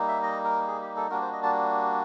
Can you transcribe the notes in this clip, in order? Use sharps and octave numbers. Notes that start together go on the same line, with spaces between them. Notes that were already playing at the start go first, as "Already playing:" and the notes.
Already playing: G3 A#3 D#4
E5
D#5
A#4
G#4
G4
A4
G3 A#3 D4 F#4 A#4
C5
D#5
A5